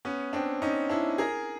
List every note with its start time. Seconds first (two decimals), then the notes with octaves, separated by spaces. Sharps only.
0.05 B3 C#4
0.33 C4 D4
0.62 C#4 D#4
0.90 D4 E4
1.18 G#4 A#4